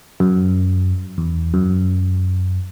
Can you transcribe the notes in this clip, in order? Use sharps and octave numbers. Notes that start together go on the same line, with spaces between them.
F#2
E2
F#2